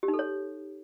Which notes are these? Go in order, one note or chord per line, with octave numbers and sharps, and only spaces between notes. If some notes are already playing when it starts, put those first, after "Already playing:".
G4
D#4
A4
C#5